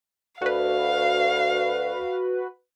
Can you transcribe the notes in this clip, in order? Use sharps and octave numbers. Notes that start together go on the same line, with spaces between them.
D2 F#4 B4 F5